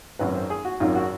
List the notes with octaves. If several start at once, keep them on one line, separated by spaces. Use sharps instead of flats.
G#1 F#2 D#3 B4
C5
G#4
F#4
G#1 F#2 D#3 F4
F#4